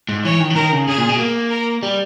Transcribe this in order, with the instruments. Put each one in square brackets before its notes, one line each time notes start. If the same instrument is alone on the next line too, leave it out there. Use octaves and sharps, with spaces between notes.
[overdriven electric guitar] G#2
[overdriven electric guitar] E3 [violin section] C#5
[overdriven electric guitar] D#3
E3
[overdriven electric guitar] D#3 [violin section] A#4
[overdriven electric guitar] C#3
[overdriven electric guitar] C#3 [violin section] G#4
[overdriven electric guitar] A#2
B2
A#3
[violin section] A#4
[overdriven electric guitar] G3